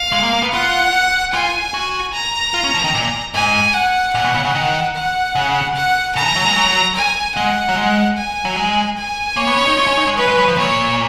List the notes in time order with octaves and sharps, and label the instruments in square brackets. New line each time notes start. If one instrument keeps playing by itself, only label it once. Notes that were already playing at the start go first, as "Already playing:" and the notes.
Already playing: [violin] F5
[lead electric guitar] G#3
A#3
A#3
B3
[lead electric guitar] F4 [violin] F#5
[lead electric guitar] F4 [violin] G#5
[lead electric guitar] F#4
[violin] A#5
[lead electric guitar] F4
C#4
F3
D#3
A#2
[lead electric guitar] G#2 [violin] G#5
[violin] F#5
[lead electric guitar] A#2 [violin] F#5
[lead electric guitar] B2
C#3
C#3
D#3
[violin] F#5
[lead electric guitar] C#3
[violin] F#5
[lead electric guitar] C#3 [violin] A#5
[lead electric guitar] F3
F#3
G#3
F#3
[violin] G#5
[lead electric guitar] G#3 [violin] F#5
[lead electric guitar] F#3
G#3
[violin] G#5
[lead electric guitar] F#3
G#3
[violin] G#5
[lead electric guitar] A#3 [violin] C#5
[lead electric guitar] B3
C#4
D#4
F4
C#4
D#4
G#3
[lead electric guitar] F#3 [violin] B4
[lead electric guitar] G#3
F#3
F3
[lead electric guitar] A#2 [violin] C#5